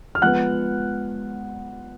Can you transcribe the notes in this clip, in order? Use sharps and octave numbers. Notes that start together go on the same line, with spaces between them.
F6
F3 G#3 B3 F#5 F#6